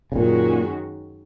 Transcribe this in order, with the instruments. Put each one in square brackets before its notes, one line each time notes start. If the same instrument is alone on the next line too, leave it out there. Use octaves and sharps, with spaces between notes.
[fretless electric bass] C#3
[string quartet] F#2 D#3 G#3 C#4 F#4 [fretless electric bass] A#2